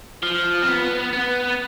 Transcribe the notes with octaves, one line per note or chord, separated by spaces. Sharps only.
F3
C4
B3
B3